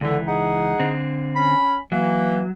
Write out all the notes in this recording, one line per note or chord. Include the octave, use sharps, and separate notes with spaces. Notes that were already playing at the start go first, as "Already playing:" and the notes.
C#2 D3 E3
D#4 G#4 F#5
D3 C4
C#4 B5
E3 F#3 A#3